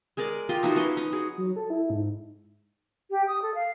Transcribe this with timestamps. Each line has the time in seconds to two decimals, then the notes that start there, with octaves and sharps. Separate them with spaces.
0.17 G#3 G#4 A#4 D5
0.49 F4 G4 D#5 C6
0.63 F3 D#4 E4 F#4
0.75 F3 C#4 B4 C6
0.97 D#4
1.12 F#4 G#4
1.38 F#3
1.56 A4
1.70 E4
1.90 G#2
3.11 G4
3.28 D#6
3.42 A4
3.55 F5